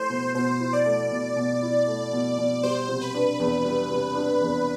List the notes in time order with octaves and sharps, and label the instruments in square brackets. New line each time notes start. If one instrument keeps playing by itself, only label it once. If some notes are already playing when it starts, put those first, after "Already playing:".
Already playing: [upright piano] A3 E4 [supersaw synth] C5
[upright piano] B2
[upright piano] B2 [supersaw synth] C5
[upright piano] E4
[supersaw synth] D5
[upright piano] A3
B2
B2
E4
A3
B2
B2
[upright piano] G3 [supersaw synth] C5
[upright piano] C3
[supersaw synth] B4
[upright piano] D4
E2
G3
C3
D4
E2